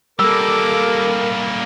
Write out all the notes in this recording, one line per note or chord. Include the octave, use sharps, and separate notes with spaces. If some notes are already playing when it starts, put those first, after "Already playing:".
G3 A#3 A4 A#4 D6 E6